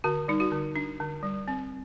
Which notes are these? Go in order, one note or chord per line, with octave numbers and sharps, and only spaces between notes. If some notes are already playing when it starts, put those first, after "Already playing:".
D3 F#4
G3 D#4
F#4
D3
D4
D3
G3
C4